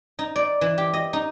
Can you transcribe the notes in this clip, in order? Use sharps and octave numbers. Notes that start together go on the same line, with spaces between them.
D#4
D5
E3
G4
D#5
D#4